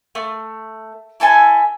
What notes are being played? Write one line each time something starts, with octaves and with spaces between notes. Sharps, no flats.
A3
E4 A4 E5 G#5